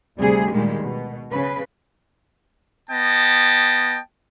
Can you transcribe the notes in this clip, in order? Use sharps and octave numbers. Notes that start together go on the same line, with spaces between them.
D2 C3 G3 G#4
A#2 D#3 G3 G#3
B2
C#3 B4
B3 D#5 G5 A5